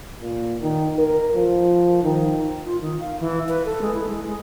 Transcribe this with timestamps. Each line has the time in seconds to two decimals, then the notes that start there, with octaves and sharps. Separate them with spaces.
0.22 A#2
0.62 D#3
0.99 A#4
1.34 F3
2.03 D#3
2.66 F4
2.81 D#3
3.00 F5
3.20 E3
3.49 B4
3.65 A4
3.82 G#3
3.94 E4
4.09 G#3
4.25 G#3